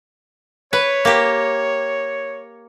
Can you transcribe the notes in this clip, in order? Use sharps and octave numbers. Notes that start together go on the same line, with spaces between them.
B4 C#5
A#3 G4